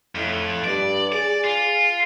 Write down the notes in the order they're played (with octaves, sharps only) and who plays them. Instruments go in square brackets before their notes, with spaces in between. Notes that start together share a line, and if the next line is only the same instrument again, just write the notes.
[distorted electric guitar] F2 [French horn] A2
[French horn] G2 [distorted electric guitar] D5
[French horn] G#4 [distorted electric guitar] D5
[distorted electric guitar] F4